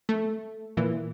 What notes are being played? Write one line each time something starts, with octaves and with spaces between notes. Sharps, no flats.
A3
A#2 E3